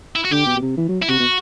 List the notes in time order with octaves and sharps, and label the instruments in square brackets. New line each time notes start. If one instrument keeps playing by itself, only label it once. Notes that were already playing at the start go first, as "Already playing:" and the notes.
[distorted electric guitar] E4
F#4
[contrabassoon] D3 [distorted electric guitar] G4
[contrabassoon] B2
B2
C3
E3
F#3
[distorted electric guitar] E4
[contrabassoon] C3 [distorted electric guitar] F#4
[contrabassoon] B2